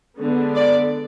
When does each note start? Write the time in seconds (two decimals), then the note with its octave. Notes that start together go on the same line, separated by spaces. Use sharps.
0.17 D3 G#3 B3 D4
0.55 D5